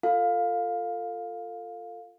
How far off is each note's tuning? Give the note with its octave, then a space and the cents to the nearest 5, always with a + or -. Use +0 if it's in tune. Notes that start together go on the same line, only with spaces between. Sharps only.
F4 +0 A4 +25 F5 +15